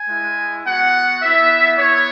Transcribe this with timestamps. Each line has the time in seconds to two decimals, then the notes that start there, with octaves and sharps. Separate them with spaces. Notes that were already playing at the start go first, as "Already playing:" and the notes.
Already playing: G#5
0.09 G#3 E4
0.65 B3 F#4 F#5
1.22 B3 E4 E5
1.78 B3 E4 C#5